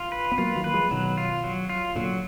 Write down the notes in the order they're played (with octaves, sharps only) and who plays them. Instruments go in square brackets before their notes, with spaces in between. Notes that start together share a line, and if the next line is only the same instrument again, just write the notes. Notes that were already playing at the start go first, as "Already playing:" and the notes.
Already playing: [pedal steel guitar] F4
B4
[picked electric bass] B3
[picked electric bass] F#3 A#3 [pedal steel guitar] F4
[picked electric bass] D#3 F#3
[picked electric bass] A#3 [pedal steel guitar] B4
[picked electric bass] F3 G#3
[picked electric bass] B2 D#3 [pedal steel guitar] F#3
[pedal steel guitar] F4
F#3
F4
[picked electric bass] A#2 D3 [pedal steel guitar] F#3